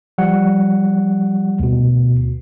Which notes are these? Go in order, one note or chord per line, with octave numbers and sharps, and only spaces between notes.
F3 G3 F#5
D2 B2